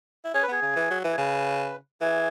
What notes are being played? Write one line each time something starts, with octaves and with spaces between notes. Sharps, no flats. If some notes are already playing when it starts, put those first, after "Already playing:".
E4
C#4 G#4
B4
B3 G#4
C#3
E3
F#3
E3
G#4
C#3 B4
E3 G#4